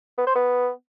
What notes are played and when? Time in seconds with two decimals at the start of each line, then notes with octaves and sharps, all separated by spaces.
0.18 B3
0.27 C5
0.35 B3